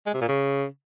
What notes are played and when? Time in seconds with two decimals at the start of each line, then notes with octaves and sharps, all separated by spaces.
0.06 G#3
0.14 C3
0.21 A#2
0.28 C#3